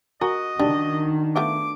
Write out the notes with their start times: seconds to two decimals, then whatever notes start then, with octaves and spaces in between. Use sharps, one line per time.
0.21 F#4 A#4 D#5 G#5
0.59 D#3 G3 D4
1.36 A3 B3 F4 D6